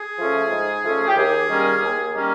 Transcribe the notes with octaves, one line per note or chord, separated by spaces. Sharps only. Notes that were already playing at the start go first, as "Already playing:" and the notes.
Already playing: G#4
F3 A3 C#4
G#2
F3 A3 C#4
G4
D#2 G#4
D#3 G3 A#3 C#4
D#2
D#3 G3 A#3 C#4